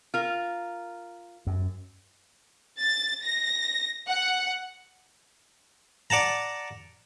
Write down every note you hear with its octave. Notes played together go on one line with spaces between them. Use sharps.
F4 A#4
F#2
A6
A#6
F#5
D5 F#5 A5 A#5